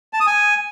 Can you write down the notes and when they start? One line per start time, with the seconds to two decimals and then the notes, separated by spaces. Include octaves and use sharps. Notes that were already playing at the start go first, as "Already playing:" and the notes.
0.13 A5
0.20 D#6
0.27 G#5